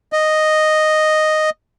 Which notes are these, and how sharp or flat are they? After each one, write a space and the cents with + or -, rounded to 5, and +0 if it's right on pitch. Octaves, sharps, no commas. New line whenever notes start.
D#5 -5